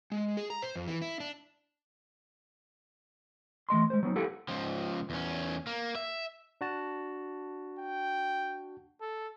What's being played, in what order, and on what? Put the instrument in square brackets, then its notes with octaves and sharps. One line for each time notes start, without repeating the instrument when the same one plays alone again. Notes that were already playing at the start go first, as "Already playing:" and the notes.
[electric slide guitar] G#3
G#4
A#5
C5
F2
E3
E4
D4
[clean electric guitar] E3 A3 D#5 C6
G#3 C5
F#3 B3 D#4
E4 G4 A4 B4 F5 F#5
[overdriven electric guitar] C#2 F3
E2 C#4
A#3
E5
[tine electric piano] D4 F#4 A5
[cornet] G5
A4